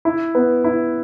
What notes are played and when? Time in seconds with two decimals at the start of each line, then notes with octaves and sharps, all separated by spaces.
0.05 E4
0.35 B3
0.64 E4